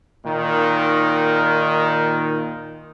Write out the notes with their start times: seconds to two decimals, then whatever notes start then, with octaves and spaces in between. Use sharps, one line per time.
0.25 A#2 D#3